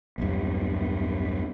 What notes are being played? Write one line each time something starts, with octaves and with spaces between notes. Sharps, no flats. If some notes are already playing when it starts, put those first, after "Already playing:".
B1 E2 G2